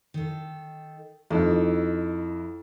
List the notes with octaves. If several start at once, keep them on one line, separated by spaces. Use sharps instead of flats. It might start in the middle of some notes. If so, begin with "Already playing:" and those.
D#3 A4
F2 D#3 E4